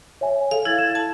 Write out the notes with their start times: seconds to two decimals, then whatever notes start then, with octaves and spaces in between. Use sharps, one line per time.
0.21 C#5 E5 G#5
0.51 A4 F5
0.65 E4 G#6 A6
0.78 G#6 E7
0.95 A5